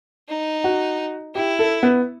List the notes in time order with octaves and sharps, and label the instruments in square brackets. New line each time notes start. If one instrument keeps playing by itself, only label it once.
[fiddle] D#4
[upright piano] F#4
[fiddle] E4 [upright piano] G4
[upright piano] A4
B3